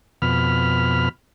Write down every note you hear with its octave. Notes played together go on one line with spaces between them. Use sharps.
F2 B2 B5 F6